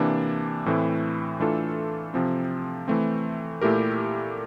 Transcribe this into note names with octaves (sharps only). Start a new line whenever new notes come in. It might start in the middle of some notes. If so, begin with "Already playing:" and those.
Already playing: C3 E3 A#3 D4
A2 E3 A3 C4 E4
E3 A3 D4 F4 A4
C3 F3 C4
E3 A3 C4
A#2 A3 E4 G4 A#4